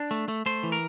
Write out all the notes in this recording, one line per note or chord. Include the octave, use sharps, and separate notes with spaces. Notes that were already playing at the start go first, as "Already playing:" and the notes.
Already playing: D4
A3
A3
A3 C5
E3
A#4